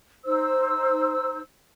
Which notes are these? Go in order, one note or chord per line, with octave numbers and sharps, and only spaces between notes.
D#4 C5 E6